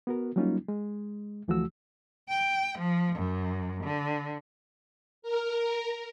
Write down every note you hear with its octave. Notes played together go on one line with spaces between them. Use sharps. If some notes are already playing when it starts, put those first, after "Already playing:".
B3 F#4 A#4
F#3 G3 A#3 C#4 D#4 F4
G#3
D2 E3 F3 A3 F#4 E6
G5
F3
F#2
D3
A#4